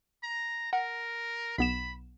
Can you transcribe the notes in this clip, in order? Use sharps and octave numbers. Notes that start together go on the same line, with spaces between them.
A#5
A#4 F#5
B1 B3 B5 E7